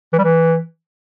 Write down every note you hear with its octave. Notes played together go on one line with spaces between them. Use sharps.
E3
G3
E3